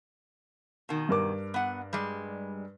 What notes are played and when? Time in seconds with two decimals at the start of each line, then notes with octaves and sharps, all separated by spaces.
0.89 B2 D#3
1.09 G2 A#4 D6
1.54 B3 F#5
1.93 G3 G#3